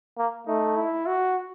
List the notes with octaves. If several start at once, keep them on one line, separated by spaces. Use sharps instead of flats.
A#3
A3 D#4
E4
F#4